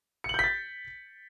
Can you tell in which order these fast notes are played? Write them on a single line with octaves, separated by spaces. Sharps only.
C#7 F#7 G6 B6 A6